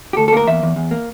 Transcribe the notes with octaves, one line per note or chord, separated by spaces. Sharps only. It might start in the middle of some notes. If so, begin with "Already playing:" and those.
G4
D2 A4
A4
A#3 A#4
E2 E5
E2
E2
A#3